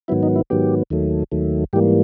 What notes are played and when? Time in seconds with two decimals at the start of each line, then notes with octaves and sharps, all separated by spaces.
0.08 G#2 D#3 F#3 B3 E4
0.23 D#4
0.36 E4
0.50 G#2 D#3 F#3 B3 G4
0.90 D#2 D#3 F#3 A3
1.32 D#2 D#3 F#3 A3
1.73 G#2 E3 G3 A#3 G4